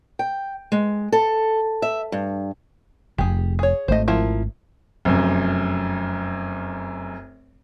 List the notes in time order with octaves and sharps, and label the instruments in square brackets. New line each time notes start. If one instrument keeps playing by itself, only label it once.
[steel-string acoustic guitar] G5
G#3
A4
E5
G2
[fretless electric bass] F1 [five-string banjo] G4 G#4
[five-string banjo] G#4 C#5
[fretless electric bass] G#1 A3 [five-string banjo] C5 D#5
[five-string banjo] F3 E4 A#4
[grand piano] F1 F#2